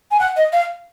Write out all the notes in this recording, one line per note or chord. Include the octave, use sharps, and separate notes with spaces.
G#5
F#5
D#5
F5